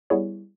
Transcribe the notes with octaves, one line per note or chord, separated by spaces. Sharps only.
G3 B3 E4 G#4 C#5